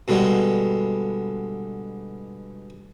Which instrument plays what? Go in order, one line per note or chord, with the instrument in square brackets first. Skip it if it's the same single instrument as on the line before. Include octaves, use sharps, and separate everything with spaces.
[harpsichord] B2 D3 G3 G#3